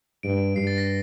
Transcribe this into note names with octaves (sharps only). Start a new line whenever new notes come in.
G2 D7
G2 C7
A6
A#6